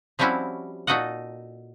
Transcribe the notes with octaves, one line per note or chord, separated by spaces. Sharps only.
F3 G3 C4 C#4 E4 F#4
A#2 D#4 F#4 A4 D#5 F#5